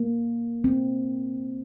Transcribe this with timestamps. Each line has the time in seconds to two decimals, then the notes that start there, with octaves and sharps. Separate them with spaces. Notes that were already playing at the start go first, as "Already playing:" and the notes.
Already playing: A#3
0.64 C4